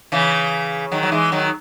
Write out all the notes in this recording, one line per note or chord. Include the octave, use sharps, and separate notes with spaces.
C#3 E3
D#3 F#3
F#3
E3 G#3
D#3 F#3